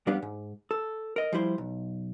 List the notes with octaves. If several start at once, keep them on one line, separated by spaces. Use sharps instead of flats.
F2 G3 B3 D4 G4 F5
G#2
A4
A#4 D#5
F3 G3 E4 C5
B1